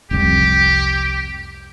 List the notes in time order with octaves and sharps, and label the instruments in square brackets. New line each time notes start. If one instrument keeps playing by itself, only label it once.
[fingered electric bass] F1 C2 [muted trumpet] G4